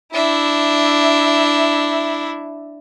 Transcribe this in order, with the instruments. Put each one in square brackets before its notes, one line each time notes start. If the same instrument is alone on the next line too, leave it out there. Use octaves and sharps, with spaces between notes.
[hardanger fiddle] D4 E5 [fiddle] E4